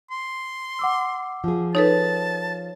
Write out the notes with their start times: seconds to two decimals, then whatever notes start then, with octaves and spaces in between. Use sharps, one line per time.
0.11 C6
0.79 F#5 D6 E6
1.44 F3 G#4
1.75 D#4 A4 B4 C#5 A5